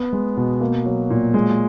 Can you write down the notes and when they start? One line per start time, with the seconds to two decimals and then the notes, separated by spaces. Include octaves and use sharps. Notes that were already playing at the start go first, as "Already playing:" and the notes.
Already playing: B3
0.13 G#3
0.37 B2
0.61 A#3
0.85 F#3
1.10 A#2
1.34 G#3